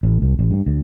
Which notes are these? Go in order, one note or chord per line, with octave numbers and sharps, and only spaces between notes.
A1
C2
A1
G2
D2